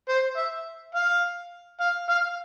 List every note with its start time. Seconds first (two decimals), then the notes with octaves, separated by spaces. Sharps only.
0.09 C5
0.37 E5
0.95 F5
1.80 F5
2.09 F5